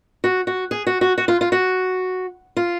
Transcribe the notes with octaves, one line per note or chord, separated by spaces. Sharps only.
F#4
F#4
G#4
F#4
F#4
F#4
F4
F4
F#4
F4